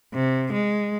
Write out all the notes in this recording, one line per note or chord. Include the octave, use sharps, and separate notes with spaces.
C3
G#3